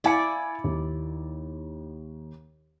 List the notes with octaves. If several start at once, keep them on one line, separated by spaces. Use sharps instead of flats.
E4 D5 F5 G#5 C#7
D#2